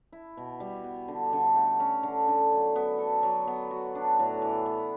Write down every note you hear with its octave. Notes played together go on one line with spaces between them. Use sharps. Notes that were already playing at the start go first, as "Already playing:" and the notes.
E4
B2
G3
B3
D3
D3
A3
C#4
D3
D3
F#3
B3
A4
F#3
B3
F#4
D4
A2
E3
B3